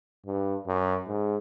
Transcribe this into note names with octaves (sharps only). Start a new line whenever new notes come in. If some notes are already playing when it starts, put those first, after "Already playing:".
G2
F#2
G#2